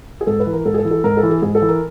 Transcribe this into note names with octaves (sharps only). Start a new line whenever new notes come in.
G#4
G#2 A4
B4
E3
A#4
G#2 A4
G#4
A4
E3
A4
G#2 A#4
A4
E3
G#4
G#2 G#4
A4
E3
A#4